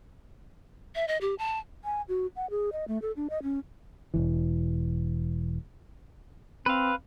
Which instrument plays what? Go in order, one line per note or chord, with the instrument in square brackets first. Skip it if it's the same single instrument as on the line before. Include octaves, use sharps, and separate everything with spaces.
[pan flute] E5
D#5
G4
A5
[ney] G#5
F#4
F#5
G#4
D#5
A3
A4
D4
D#5
C#4
[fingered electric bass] E1 C#2 E3
[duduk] C4 [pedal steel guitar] B4 F5